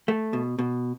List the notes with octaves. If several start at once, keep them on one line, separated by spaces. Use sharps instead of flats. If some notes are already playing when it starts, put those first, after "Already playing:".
A3
B2
B2